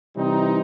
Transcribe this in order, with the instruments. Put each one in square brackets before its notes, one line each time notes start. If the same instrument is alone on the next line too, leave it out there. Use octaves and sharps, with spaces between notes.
[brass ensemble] C3 E3 G3 C4 D#4